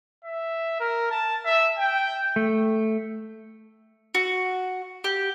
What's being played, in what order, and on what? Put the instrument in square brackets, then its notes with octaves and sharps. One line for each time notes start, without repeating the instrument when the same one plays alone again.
[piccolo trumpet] E5
A#4
A5
E5
G5
[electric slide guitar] A3
[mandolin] F#4
G4